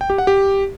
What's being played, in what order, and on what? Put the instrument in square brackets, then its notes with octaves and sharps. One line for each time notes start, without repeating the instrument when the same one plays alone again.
[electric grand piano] G5
G4
F#5
G4